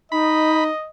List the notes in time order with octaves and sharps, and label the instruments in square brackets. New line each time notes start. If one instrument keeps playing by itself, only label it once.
[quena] D#4 [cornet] D#5 [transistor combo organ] B5